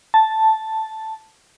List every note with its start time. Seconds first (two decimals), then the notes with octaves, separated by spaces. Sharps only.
0.14 A5